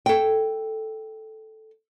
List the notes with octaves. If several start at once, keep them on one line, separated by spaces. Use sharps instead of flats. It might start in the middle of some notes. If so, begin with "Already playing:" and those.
A4 G5